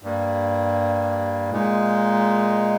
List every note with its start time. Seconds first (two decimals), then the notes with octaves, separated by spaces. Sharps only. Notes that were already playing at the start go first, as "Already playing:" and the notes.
0.03 G2 G3 A#3
1.50 A#2 G#3 D#4